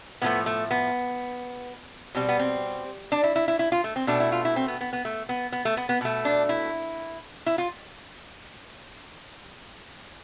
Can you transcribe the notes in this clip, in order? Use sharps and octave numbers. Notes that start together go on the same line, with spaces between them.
A2 F3 A3 B3
A3
B3
B2 G3 C4
B3
C4
D4
E4
E4
E4
E4
F4
A3
C4
B2 A3 D4
E4
F4
E4
C4
B3
B3
B3
A3
B3
B3
A3
B3
B3
B2 A3
D4
E4
E4
F4